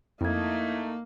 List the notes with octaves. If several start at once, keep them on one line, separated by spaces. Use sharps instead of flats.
F2 A3 A#3 D#4 E4 G#6